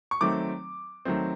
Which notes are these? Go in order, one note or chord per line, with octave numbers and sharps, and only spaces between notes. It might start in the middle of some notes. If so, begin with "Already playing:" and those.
C#6
D#3 F#3 A3 C4 D6
D#3 F#3 A3 C4